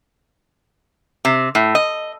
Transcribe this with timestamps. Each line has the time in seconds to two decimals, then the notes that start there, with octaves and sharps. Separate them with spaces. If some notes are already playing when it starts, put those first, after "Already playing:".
1.25 C3
1.55 A2
1.75 D#5